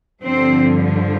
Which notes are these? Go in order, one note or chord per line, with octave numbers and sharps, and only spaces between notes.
G2 D3 F3 C4